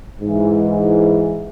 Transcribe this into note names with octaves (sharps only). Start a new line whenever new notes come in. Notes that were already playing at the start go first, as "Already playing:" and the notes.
G#2 E3